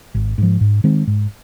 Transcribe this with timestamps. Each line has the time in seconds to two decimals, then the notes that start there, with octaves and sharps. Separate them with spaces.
0.15 G#1
0.38 G#2 F3
0.61 G#2
0.84 D#3 G#3 C4
1.07 G#2